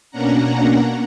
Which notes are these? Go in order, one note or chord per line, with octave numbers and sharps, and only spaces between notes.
B2 A#3 C#4 D4 F#5 A#5